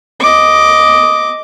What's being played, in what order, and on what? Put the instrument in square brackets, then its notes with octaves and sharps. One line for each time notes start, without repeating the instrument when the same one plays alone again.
[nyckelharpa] D#5 D6